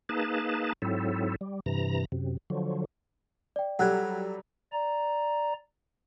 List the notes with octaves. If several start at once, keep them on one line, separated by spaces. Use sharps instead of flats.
A#3 D#4 G#4 B4 A5
G#2 F#3 C4 E4 A4
G3
G2 C3 E3 A#5
F#2 C3
D3 F3 F#3
D5 G5
F#3 G3 G4 A4 F#5 F#6 G#6
D5 A#5